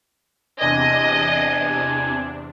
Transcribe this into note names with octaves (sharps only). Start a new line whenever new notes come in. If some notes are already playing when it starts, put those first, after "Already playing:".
E2 C3 D4 D#5 G#5